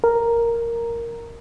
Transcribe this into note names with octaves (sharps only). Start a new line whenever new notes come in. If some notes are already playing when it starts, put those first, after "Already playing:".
A#4